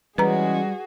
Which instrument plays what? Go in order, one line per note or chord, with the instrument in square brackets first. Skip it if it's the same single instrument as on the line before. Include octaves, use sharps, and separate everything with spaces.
[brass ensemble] E3 G#3 C#4 [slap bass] G3 [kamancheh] F#4 G#4 [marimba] B4 A#5